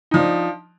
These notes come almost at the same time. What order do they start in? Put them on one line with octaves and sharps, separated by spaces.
D#4 F3 D4